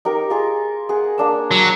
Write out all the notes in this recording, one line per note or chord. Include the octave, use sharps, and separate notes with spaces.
D#4 G4 A#4
F4 G#4 A#4
G#4 F#5
A#3 D4 E6
F#3